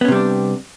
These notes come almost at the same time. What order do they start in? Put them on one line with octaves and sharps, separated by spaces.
B3 C#4 C3 G3 D4